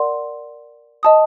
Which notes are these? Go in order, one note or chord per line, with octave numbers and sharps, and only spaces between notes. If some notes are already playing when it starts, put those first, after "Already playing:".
Already playing: A#4 D5 F#5 C6
D#5 A5 D#6